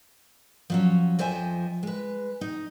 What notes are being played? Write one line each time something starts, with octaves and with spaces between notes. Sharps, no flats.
F3 F#3 C#4
F2 F3 C5 D#5 E5 G#5
G#3 B4
D#4